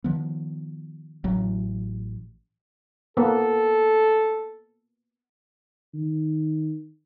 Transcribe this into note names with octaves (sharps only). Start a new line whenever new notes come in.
D#3 F3 B3
A1 F#3
A#3 B3 A4
D#3